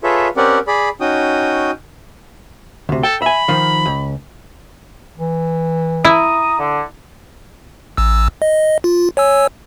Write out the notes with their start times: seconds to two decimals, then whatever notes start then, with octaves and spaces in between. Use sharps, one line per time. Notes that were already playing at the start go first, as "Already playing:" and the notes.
0.03 F4 G#4 A4 B4 C#5 E5
0.37 C4 C#4 G4 A#4 D5 F#5
0.67 G#4 D5 B5
1.01 C#4 D#4 F#4 G5 D#6
2.89 D2 C3
3.03 A4 G5
3.22 E5 G#5 B5
3.48 D#3 F3
3.86 C#2
5.18 E3
6.05 E4 A#5 D#6
6.59 D3
7.97 A1 E6
8.42 D#5
8.84 F4
9.17 C#5 G#5 E6